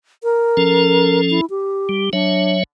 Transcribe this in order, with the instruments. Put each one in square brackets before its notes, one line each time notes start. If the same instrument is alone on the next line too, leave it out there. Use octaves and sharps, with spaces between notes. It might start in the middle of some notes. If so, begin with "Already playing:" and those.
[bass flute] A#4
[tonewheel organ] F3 C#4 A4
[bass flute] E4
G4
[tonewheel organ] G3
[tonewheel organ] F#3 C#5 E5 [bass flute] D4